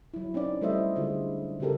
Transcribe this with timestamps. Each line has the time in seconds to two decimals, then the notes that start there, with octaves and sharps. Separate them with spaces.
0.14 F#3 E4
0.34 C4 C#4 D#4 D5
0.61 G3 A3 E4 C5 D#5 E5
0.95 D3 G#3 F4 C5
1.60 C#3 C4 F#4 G4 A4 A#4